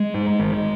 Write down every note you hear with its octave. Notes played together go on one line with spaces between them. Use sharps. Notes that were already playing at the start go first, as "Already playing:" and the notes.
Already playing: G#3
G#2
G#1